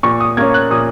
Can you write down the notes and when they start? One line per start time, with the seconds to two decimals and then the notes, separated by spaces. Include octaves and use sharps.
0.03 A#2 C#6
0.21 D#6
0.37 A#3 C#4 G#6
0.54 F#6
0.70 A#2 D#6